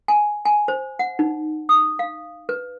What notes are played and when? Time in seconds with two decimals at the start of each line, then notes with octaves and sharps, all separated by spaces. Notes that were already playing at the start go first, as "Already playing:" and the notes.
0.08 G#5
0.45 G#5
0.68 C5
0.99 F#5
1.19 D#4
1.69 D#6
1.99 F5
2.49 B4